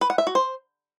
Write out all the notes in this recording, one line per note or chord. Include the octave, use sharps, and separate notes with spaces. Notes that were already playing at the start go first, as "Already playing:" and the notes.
B4
F#5
E5
F#4
C5